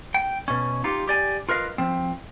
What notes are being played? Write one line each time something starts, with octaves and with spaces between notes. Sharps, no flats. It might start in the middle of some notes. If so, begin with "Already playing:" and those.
G5
B2 C#4
D#4 F4 G4
G4 D5 G#5
F4 A#4 B4 D#5 F5
F3 C4